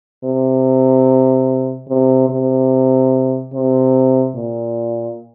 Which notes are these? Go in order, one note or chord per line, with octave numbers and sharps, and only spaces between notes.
C3
C3
C3
C3
A#2